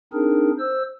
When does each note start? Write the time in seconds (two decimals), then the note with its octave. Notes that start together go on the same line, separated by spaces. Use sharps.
0.13 C4 D4 D#4 G#4 A#4
0.59 C5 E6